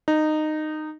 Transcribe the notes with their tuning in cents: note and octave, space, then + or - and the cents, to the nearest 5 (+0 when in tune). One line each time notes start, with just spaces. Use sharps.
D#4 -15